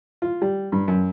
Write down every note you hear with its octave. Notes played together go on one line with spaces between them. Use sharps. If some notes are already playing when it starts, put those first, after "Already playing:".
F4
G3
G2
F#2